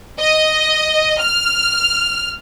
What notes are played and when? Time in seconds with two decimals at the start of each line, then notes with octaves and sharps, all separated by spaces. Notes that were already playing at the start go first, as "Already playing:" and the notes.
0.19 D#5
1.20 F6